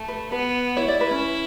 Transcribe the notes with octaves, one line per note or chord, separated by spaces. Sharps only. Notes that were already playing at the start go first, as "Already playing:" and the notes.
Already playing: A3
B4
B3 B4
E4 C#5
D5
B4
C#4